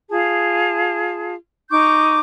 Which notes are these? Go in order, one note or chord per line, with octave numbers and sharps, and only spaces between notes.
F4 G#4 A5
D#4 C#6 D6 G6